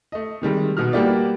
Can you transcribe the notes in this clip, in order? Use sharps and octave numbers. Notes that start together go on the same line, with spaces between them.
A3 D#5
C3 D#3 G3 G#3
B2 F#4 F6
G3 A#3 F#4 G4 B4 D5